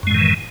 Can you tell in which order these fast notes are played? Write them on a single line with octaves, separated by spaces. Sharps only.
F#2 G#3 A2 D#3 E3